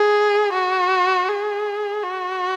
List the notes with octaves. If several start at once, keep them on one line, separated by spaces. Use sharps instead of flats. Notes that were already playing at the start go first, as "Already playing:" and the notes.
Already playing: G#4
F#4
G#4
F#4